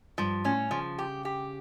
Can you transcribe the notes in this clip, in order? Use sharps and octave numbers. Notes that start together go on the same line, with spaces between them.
G2 F3
A2 C#4
C#3 F3
G4
G4